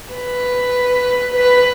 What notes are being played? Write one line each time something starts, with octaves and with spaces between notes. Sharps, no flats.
B4
B4